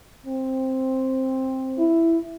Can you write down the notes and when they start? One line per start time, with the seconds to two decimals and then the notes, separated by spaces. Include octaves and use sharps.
0.25 C4
1.79 E4